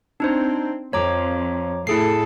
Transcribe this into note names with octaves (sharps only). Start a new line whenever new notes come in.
C4 D4 D#4 C5
F2 C#5 A#5 D6
A2 E4 G#4 A4 C7